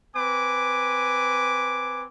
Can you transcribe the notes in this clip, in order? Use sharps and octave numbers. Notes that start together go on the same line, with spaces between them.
C4 B4 G#5 D6